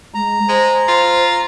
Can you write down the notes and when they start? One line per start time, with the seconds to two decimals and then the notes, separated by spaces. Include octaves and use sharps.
0.14 G#3 A#5
0.48 G#3 C5
0.88 F4